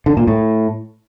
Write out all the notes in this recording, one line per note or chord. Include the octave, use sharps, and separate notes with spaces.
D3
A#2
A2